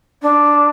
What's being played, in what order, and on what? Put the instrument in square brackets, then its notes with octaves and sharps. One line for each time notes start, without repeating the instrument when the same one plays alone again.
[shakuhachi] D4